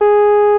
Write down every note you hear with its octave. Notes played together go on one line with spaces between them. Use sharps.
G#4